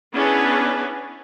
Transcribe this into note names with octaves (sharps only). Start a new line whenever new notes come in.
B3 C#4 D4 E4 G#4 B4